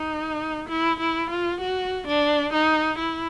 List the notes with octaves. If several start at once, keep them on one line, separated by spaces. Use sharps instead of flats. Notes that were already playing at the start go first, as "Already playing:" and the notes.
Already playing: D#4
E4
E4
F4
F#4
D4
D#4
E4